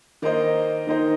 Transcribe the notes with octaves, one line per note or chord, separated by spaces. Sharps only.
D#3 A#3 D#4 C5 D#5
D#3 A#3 D#4 C5 D#5